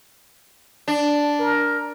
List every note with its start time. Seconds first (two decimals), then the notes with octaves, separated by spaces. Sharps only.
0.88 D4
1.40 A#4